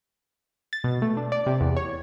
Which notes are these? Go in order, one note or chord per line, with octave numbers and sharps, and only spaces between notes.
A6
B2
A3
D4
D5
C3
E2
C#5